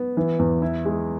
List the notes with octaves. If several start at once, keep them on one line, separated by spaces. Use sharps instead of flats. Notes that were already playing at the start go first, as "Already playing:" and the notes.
Already playing: B3
E3
E2
E4
G#3